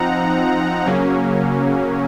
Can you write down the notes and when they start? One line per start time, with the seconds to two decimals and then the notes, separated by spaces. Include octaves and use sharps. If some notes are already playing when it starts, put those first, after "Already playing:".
Already playing: F3 C4 D#4 F#5 A#5
0.86 C#3 F#3 A#3 C#4